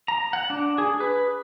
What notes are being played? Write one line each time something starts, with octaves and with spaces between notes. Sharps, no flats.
A#5
F#5
D4
G#4
B4